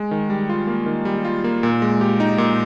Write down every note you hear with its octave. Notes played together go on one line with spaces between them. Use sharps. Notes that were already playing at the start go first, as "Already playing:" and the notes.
Already playing: G#3
D#3
G3
F4
A#3
D#3
G3
F4
A#3
A#2
G#3
G4
D#4
A#2